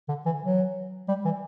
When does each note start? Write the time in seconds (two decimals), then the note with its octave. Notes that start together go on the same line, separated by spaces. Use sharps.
0.08 D3
0.26 E3
0.43 F#3
1.08 G3
1.25 E3